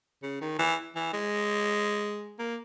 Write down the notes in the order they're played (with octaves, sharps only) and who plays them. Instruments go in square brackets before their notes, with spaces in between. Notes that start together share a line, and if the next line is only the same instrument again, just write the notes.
[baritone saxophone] C#3
D#3
E3
E3
G#3
A#3